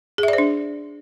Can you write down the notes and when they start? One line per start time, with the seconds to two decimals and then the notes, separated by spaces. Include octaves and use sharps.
0.18 G#4
0.23 E5
0.28 D5
0.33 C5
0.38 D4